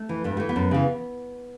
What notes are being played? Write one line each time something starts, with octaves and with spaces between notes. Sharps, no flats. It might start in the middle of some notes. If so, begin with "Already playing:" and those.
Already playing: A3
E3
G2 B3
E3 A3
B3
F#2
C#3 E3